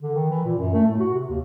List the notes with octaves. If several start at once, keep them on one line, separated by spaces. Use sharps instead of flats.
D3
D#3
E3
A#2
F#2
A3
A2
F#4
C3
D#2